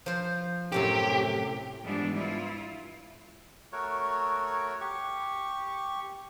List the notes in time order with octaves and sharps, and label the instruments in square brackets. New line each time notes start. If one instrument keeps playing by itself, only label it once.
[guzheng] F3 C5
[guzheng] F#2 A2 C3 [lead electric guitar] G4
[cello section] G#2 E3 F3 G3 B3 D4
E4 F4
[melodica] A3 F#4 A#4 C#5
G4 C#6